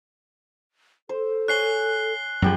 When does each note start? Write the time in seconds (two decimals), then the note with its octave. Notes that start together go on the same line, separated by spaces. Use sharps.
1.09 A4 C5
1.48 C#5 G#5 F#6 C7 G7
2.42 F#2 F3 B3 G4 G#4